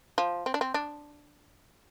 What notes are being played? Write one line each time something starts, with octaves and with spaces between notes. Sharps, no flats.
F3
C4
D4
C4
D4